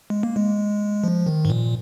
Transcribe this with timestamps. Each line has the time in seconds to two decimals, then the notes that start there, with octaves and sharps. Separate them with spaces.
0.10 G#3
0.23 A#3
0.36 G#3
1.04 F3
1.26 D#3
1.45 G#2
1.50 A#2